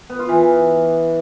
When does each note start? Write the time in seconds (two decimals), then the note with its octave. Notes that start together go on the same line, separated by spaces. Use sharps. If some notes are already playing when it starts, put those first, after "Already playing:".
0.10 B3
0.19 F4
0.29 E3